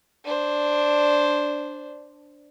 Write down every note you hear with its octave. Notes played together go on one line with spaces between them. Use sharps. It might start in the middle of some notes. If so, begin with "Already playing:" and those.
D4 C5